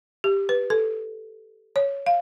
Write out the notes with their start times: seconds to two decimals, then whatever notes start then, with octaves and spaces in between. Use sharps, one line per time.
0.24 G4
0.49 B4
0.70 A4
1.76 C#5
2.06 F5